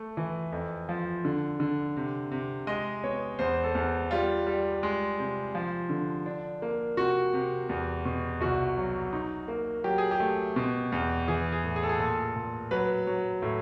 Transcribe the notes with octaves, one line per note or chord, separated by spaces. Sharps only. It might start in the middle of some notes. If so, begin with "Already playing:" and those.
Already playing: A3
E3
F2
F3
D3
D3
C3
C3
G#3 D#5
B3 C#5
E2 C5
A4
E2
G3 F4
G3
G#3
C3
F3
D3
D4
A#3
C3 F#4
C3
E2
B2
C2 F#4
F#3
D#4
A#3
F#3 G4
G#4
G4
A3
B2
E2
E3 G#4
G#4
A2
G#4
A4
G#4
A#2 A4
A#2
F#3 B4
F#3
A2